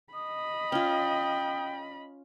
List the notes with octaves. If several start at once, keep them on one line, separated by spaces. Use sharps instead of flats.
D#5 B5 D#6
C#4 F4 G5